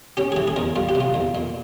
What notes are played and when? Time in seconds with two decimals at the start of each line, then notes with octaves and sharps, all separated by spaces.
0.17 C#4 G4
0.32 G#4
0.36 E3 G4
0.48 G#4
0.56 E2 A#4
0.76 G3 F4
0.89 G4
0.95 C3
1.00 F4
1.14 E2
1.35 A#2